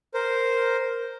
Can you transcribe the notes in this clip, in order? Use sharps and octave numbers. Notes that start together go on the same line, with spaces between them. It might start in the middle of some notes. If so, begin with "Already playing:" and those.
A#4 C5